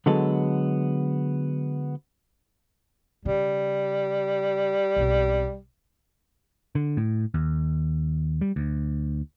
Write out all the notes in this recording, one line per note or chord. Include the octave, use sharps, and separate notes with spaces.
D3 F#3 G#3 B3 A4
C#3 G3
B1 C4
D3
A2
D#2
G3
D2